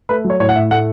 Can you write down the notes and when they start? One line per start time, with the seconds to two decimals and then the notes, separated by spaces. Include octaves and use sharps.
0.09 A3 B4
0.25 F#3
0.30 C#5
0.40 A2 C#5
0.49 F#5
0.55 A2 E5
0.71 A3 F#5